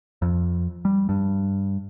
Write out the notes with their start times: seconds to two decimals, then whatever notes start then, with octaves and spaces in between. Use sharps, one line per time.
0.22 F2
0.85 G3
1.09 G2